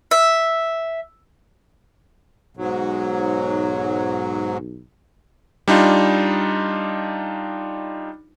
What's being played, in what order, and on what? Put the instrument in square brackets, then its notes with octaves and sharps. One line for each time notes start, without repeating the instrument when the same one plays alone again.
[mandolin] E5
[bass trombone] B1 [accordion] G#2 F#3
[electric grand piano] G3 D4 D#4 F4